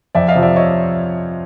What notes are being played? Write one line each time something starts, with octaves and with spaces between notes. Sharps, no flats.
F2 D5 E5
D#5 F5
C3 F3
D5 E5
C#5 D#5